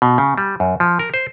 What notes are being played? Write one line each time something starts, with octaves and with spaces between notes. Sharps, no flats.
B2
C#3
G3
F#2
F3
A#4
C5